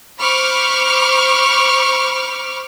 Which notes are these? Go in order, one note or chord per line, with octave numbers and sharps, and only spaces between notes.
C5 B5 C#6 D6 F6